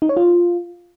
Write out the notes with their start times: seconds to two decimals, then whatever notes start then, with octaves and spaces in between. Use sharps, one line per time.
0.02 D#4
0.09 C#5
0.17 F4